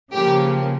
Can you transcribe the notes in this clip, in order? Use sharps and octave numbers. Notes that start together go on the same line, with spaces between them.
C#3 F3 A#3 G4